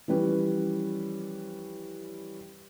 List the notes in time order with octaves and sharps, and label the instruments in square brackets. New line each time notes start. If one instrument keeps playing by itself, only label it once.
[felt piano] E3 F3 G3 C#4 B4